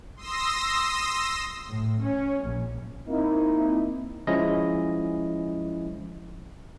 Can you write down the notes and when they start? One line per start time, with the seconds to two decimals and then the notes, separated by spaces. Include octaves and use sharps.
0.16 C6 D#6 E6 A#6
1.68 A2
2.00 C#4
2.46 A#1
3.07 A#3 C4 D#4 E4
4.27 F3 G#3 C#4 E4 D#5